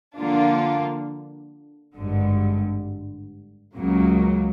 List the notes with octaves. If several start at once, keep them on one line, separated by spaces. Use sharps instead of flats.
D3 F3 A#3 D4 F4
G#1 G2 D3
C#2 C#3 F#3 A#3